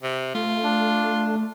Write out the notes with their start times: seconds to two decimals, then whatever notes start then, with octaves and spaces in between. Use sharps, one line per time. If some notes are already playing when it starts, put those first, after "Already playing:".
0.02 C3
0.35 A3 F4
0.63 D4